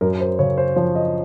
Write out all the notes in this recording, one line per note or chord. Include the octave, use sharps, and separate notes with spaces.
F#2 A#4
C5
C#3 C#5
C5
F3 C#5
D#5